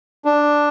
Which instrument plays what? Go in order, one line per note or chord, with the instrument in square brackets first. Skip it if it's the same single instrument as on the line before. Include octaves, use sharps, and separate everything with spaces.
[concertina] D4